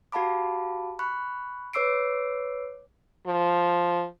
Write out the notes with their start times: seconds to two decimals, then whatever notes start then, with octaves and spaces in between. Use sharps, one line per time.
0.12 F#4 G4 F5 A5 B5 D6
0.99 B5 C#6 F#6
1.73 B4 C#5 D6 E6 C7 D7
3.27 F3